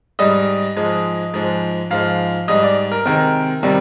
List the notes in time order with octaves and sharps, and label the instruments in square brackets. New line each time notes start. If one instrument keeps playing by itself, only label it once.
[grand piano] G#2 G3 D#5
G#2 F3 G#3
G#2 F3 G#3
G#2 F3 G#3 F5
G#2 G3 D#5
D5
A#4
C3 D#3 G#3 A#4
C3 D#3 G3